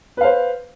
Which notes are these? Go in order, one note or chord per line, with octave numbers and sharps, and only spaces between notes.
B4 C5 F5